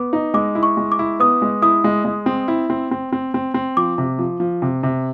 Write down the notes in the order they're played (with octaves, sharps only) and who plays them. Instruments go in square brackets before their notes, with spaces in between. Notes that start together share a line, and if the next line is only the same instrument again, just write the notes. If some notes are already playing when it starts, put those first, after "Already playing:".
Already playing: [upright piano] B3 [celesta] D6
[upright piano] D#4
[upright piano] G#3 [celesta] D6
[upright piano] E4
[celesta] C#6
[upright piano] G#3
[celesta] D6
[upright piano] E4
[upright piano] B3 [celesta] D#6
[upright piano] G#3
[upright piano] E4 [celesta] D#6
[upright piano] G#3
G#3
C4
E4
C4
C4
C4
C4
C4
[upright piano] F3 [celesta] D6
[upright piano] C3
F3
F3
C3
C3